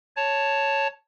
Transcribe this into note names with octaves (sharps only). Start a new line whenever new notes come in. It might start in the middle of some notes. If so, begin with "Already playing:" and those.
C#5 A5